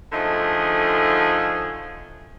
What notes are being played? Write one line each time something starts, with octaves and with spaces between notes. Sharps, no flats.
D3 F3 A3 D#4 G#4